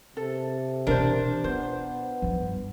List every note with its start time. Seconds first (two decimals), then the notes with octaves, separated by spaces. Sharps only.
0.17 C3 A4
0.87 B2 E3 D4 A#4 C5
1.44 B3 F4 C5
2.22 G2 F3